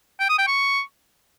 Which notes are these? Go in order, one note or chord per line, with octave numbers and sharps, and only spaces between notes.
G5
D#6
G5
C#6